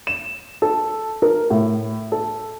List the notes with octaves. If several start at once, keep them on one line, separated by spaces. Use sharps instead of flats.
E7
A4
A#4
A2
A4